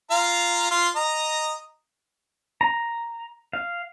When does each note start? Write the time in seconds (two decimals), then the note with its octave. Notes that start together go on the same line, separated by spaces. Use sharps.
0.11 F4 F5 A#5
0.71 F4 C6
0.96 D#5 A#5
2.61 A#5
3.53 F5